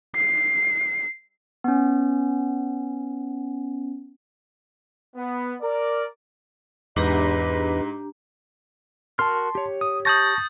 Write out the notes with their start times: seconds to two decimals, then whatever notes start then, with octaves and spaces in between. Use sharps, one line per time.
0.15 C7
1.64 B3 C#4
5.16 B3
5.61 A#4 D5
6.96 E2 G#2 D4 G4 B4 D#5 A#5
9.19 F#4 A#4 A5 C6 F6
9.55 G4 C#5
9.81 D#6
10.05 A5 C#6 D#6 G6 A6 A#6